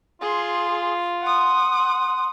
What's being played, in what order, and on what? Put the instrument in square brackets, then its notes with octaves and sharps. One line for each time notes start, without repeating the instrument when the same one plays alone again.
[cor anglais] F4 [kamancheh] G#4 C6
[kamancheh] F#5 D#6 [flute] C6